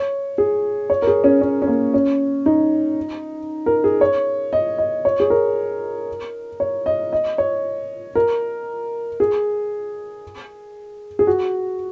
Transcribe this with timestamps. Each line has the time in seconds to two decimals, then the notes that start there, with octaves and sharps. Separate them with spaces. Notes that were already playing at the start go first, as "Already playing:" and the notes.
Already playing: C#5
0.38 G#4
0.90 C#5
1.02 A#4
1.07 G#4
1.24 C#4
1.42 C#4
1.62 C#4
1.67 A#3
1.94 C#4
2.46 D#4
3.66 A#4
3.84 G#4
4.01 C#5
4.53 D#5
4.78 D#5
5.05 C#5
5.20 G#4
5.30 A#4
6.60 C#5
6.86 D#5
7.13 D#5
7.38 C#5
8.15 A#4
9.20 G#4
11.19 G#4
11.27 F#4